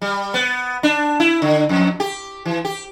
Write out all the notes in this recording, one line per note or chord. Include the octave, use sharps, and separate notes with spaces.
G3
B3
D4
E4
D3
F2
G4
E3
G4